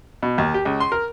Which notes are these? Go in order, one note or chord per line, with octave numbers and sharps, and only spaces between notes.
B2
D#2
G4
C#2
C6
A#4